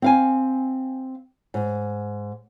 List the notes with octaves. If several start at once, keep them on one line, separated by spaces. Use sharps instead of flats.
C4 F5 G#5
G#2